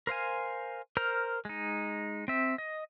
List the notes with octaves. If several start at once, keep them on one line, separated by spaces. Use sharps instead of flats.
A#4 C5 F5 G#5
A#4 C5 A#5 F6
G#3 D#4
C4 E5
D#5